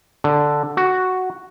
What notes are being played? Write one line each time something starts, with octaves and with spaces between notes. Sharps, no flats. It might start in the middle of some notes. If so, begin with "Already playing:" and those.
D3
F#4